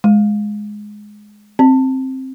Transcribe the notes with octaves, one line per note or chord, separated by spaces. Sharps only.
G#3
C4